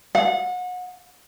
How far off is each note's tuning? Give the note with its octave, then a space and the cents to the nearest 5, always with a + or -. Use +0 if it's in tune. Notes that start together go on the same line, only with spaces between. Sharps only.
F#5 -30